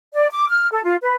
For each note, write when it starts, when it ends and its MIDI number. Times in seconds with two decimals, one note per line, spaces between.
0.14 0.27 74
0.30 0.47 86
0.49 0.67 89
0.71 0.82 69
0.83 0.96 65
1.01 1.14 71